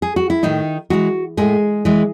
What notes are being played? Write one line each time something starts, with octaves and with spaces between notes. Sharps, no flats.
G#4
F#4
E4
A2 D#3 D#4
E3 F#3 G#3 F#4
A2 G#3 G#4
E3 G#3